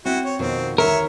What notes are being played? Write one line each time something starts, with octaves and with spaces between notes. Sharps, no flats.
C4 E4 F#4
C#5
F2 B2 D#3 C4
D2 D#3 A#4 C#5 E5